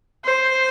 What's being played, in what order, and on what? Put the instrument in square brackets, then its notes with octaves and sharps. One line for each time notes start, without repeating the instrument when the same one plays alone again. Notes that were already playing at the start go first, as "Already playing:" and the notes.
[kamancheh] C5